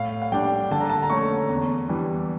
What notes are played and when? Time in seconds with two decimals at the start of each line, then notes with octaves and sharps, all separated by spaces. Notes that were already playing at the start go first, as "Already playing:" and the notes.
Already playing: A2 F5
0.22 F5
0.32 G3 D4 G5
0.71 D3 A5
0.80 A#5
0.90 A5
1.02 A#5
1.10 A3 C#4 C#6
1.49 E2
1.88 E3 G3 D4